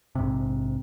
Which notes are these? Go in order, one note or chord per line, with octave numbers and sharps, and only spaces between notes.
A#1 G#2 C3